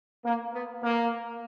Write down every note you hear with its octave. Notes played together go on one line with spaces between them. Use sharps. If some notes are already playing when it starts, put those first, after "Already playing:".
A#3
B3
A#3